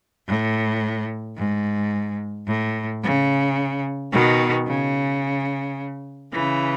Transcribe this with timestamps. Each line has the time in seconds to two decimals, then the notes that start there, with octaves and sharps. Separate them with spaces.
0.27 A2
1.37 G#2
2.47 A2
3.03 C#3
4.13 B2 D#3
4.68 C#3
6.33 C#3 E3